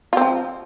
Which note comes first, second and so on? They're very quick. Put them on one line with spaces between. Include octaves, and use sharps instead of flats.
F4 C4 F3